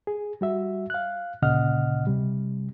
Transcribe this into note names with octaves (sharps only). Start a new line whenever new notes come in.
G#4
G3 F#4 E5
F5 F#6
D2 A#2 C#3 D#5 F#5 F6
C3 G3